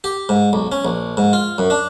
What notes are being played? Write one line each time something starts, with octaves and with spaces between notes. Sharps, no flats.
G4
G#2
B1
C#4
A#1
G#2
F4
F#2
D4